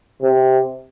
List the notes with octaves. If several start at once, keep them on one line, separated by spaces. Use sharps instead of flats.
C3